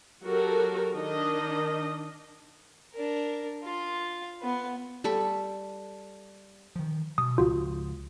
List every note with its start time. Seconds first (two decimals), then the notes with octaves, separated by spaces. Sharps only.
0.24 F#3 F#4 G4 A4 A#4
0.95 D#3 D4 D#5
2.94 D4 A#4
3.64 F4
4.41 B3 B4
5.04 G3 A4 B5 C#6
6.76 D#3 F3
7.18 B2 D#6
7.38 C#2 F3 F4 F#4